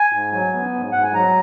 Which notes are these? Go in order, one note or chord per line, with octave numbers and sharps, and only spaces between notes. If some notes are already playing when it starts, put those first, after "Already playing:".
Already playing: G#5
G#2
F#3
B3
G#2
G#2 F#5
G#5
F#3 A#5